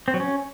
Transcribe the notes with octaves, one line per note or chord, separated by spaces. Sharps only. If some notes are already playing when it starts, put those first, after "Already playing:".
C4
F#3
C#4